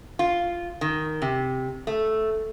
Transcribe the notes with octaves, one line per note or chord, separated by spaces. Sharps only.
F4
D#3
C3
A3